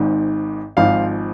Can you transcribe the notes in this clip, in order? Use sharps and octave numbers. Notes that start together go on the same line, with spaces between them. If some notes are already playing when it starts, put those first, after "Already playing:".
Already playing: G#1 G#2 D#3
G#1 G#2 F3 F5